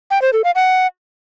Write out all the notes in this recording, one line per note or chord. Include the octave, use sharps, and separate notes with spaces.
G5
C5
A4
F5
F#5